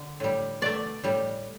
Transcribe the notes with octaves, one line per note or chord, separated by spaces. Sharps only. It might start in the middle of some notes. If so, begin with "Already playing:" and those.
Already playing: D3
A2 G3
B2 A3 D5
A2 G3